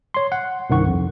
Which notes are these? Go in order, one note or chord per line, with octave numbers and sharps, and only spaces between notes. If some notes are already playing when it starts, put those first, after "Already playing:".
C#5 C6
F#5
C2 G2 D#3 F#5 C#6
F2